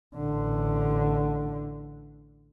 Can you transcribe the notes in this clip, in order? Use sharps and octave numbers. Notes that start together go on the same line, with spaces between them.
A1 D3